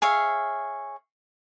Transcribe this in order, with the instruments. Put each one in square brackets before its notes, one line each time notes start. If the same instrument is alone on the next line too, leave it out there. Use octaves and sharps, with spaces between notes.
[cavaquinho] G#4 C#5 E5 F5